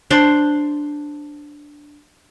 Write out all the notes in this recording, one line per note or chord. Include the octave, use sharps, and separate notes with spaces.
D4 C5 D5 C6